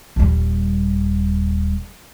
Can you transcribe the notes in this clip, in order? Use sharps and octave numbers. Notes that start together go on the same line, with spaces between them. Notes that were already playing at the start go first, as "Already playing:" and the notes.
D#1 G3